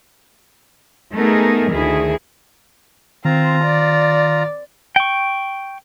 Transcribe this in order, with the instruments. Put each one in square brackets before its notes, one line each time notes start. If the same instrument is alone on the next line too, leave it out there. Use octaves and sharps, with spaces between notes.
[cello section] A3 B3 D#4 G#4 A#4
D2 D#3 E4 G#4
[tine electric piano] D#3 [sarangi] C4 [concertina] F4 A#5
[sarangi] D5
[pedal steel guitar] G5 C#6